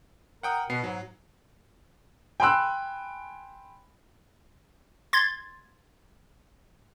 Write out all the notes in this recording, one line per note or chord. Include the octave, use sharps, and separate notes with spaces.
A#4 F#5 G5 D#6
B2 B3 C7
G#2 F#3
G5 G#5 B5 C6 E6 F#6
C6 G#6 A6